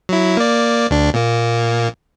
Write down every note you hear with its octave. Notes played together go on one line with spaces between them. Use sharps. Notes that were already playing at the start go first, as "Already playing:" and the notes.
F#3 E4
A#3 D5
D2 D4
A#2 A#3